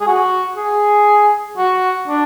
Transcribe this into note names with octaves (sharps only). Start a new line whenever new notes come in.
G#4
F#4
G#4
F#4
D4